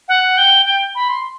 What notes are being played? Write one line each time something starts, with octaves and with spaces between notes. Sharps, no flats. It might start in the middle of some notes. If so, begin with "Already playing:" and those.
F#5
G5
G5
B5
C6